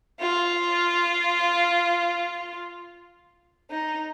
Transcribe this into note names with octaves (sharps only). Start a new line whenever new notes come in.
F4
D#4